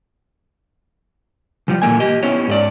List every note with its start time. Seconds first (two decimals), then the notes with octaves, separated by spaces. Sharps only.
1.68 E3 F3 G3
1.82 A#2 E3 A3 A#3 G#5
2.00 G4 D#5
2.23 B3 C#4 E4 C#5
2.48 G#2 A4 D5